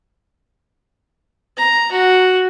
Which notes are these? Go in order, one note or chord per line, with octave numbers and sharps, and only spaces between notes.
A#5
F#4